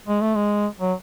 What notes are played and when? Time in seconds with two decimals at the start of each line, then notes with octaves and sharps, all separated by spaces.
0.08 G#3
0.21 A3
0.35 G#3
0.81 F#3